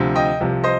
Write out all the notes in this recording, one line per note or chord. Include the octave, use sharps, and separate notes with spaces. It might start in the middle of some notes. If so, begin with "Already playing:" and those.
Already playing: D2 C3 F3
D#5 G5
C2 C3 F3
C5 D#5